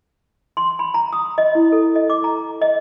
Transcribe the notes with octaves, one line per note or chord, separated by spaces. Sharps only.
C6
B5
A#5
D#6
D#5
E4
A4
D#5
D6
A#5
D#5